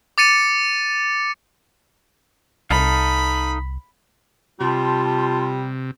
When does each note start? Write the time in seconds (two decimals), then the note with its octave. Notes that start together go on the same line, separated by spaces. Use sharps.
0.18 D6 A6 C#7 D#7
2.71 C2 D#4 A4 F5 B5
4.60 C3 G3 F4 A5 C6